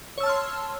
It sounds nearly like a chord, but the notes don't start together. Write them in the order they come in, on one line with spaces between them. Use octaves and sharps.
C#5 E6 A5 F6 C6